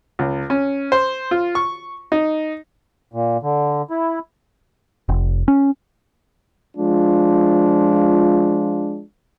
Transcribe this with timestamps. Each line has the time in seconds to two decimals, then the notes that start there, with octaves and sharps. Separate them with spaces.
0.19 C#2
0.50 C#4
0.92 C5
1.31 F4
1.55 C#6
2.12 D#4
3.13 A#2
3.43 D3
3.90 E4
5.09 F1
5.48 C#4
6.76 F3 G#3 D4 F4